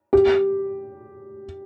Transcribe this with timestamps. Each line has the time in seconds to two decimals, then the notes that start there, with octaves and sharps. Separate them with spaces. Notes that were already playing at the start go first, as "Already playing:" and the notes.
0.13 G4